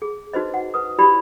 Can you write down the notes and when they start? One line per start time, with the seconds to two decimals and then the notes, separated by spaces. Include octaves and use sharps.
0.02 G#4
0.33 D#4 F#4 B4 C5 D#5
0.54 F#5
0.74 B4 D#6
0.98 E4 F#4 G4 D5 B5